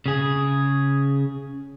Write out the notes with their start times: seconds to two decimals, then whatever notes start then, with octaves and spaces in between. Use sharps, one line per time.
0.06 C#3 G#4